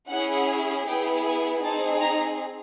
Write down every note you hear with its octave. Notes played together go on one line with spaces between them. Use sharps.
C#4 E4 G#4 F#5
B3 E4 G#4 G5
G#5
C4 D#4 G#4 A5
A#5